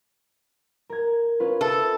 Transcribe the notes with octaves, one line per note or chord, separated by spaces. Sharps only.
A#4 G#6
C#4 F4 B4
A4 E5